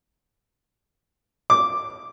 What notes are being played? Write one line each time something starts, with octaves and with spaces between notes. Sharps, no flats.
D6